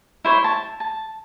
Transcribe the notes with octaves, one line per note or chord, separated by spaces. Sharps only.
E4 C5 C#5
A5
A5